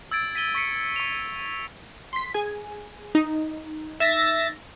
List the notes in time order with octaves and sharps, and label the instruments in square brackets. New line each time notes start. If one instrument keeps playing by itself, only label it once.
[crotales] E6 G#6 A6 D7
B6 D#7 G7
C#6 B6 C#7 D7
C#6 C#7 F7
[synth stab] C6 B6
G#4 G#5
D#4
[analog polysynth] E5 A6 A#6